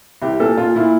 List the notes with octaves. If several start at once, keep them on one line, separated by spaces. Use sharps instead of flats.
C2 G4
A#2 A4
A#2 F4
A#2 E4